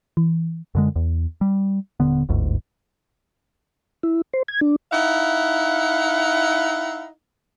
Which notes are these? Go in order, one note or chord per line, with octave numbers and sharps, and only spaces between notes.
E3
F#2 D3 G#3
E2
G3
D#1 D3 B3
G1 D2 G#2
E4
C5
G#6
D4
D#4 E4 F5 F#5